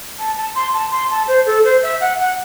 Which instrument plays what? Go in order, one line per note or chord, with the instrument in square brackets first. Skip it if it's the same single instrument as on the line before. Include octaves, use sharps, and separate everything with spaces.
[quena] A5
A5
C6
A5
C6
A5
C5
A4
C5
E5
F#5
F#5